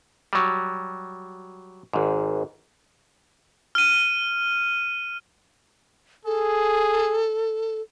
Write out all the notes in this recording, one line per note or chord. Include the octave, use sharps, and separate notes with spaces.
F#3 G3
G#1 G#2
F6 D#7
G#4 A4